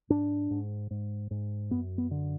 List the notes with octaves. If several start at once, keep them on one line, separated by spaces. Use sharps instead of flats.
G#2 D4
G#2
G#2
G#2
F#2 B3
B3
D3